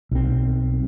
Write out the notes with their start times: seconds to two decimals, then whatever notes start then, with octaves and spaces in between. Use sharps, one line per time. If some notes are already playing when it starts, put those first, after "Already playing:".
0.11 B1 C4